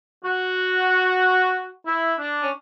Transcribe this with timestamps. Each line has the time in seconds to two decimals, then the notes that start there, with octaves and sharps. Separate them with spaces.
0.24 F#4
1.86 E4
2.19 D4
2.42 C#4